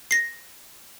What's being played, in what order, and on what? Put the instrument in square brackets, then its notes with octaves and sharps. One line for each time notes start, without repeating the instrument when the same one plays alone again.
[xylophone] A#6 C7